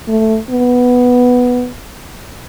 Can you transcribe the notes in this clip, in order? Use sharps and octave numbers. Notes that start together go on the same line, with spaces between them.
A3
B3